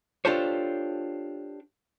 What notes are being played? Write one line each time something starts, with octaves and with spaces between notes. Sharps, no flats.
D4 F4 G4 A4 C5 C#5